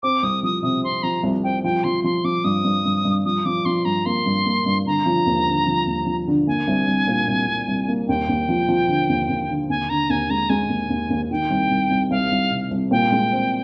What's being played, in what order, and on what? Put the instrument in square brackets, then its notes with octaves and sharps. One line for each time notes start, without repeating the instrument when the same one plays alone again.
[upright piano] C4 [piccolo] D6
[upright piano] C2 [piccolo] D#6
[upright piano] F3 [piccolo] D#6
[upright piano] C3 [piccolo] D#6
[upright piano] C4 [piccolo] C6
[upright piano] F3 [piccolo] A#5
[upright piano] C2
[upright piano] C4 [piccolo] G5
[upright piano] F3 [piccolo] G5
[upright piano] F3 [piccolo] C6
[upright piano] F3 [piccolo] C6
[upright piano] F3 [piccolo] D6
[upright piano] G2 [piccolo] D#6
[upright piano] G2
G2
G2
[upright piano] F3 [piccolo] D#6
[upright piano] F3 [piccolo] D6
[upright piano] F3 [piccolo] C6
[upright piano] G2 [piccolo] A#5
[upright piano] A#3 [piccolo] C6
[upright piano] G2
A#3
G2
[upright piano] D3 [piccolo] A#5
[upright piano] F3
D#2
D3
F3
D#2
F3
D3
[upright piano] A#3 [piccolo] G#5
[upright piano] C2
C2
A#2
C2
C2
C2
A#3
[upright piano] D#2 [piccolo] G5
[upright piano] D#2
F3
F3
D3
D#2
D#2
D3
[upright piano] D#2 [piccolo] G#5
[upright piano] D3 [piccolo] A#5
[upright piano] D#2 [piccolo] G#5
[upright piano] G#3 [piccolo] A#5
[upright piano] G#3 [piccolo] G#5
[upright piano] D#2
D#2
D#2
[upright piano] D#3 [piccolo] G5
[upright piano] C2
C2
C2
[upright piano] C2 [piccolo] F5
[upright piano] C2
C3
C2
[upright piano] A#2 [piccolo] G5
[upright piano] G#3
C4